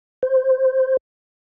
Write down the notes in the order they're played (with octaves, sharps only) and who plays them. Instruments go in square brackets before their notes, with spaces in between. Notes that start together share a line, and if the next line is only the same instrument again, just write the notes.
[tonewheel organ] C5